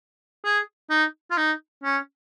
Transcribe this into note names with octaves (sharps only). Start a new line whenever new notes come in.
G#4
D#4
F4
D#4
C#4